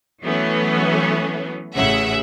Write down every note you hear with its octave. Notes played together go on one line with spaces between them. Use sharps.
E3 F#3 A3 B3 C#4
A1 C#3 E5 F#5